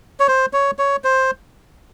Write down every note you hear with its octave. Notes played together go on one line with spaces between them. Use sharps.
C#5
C5
C#5
C#5
C5